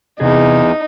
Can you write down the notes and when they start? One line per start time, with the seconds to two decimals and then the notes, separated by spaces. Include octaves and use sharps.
0.20 E2 C3 D#4 G#4